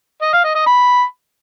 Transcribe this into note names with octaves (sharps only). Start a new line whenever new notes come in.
D#5
F5
D#5
D#5
B5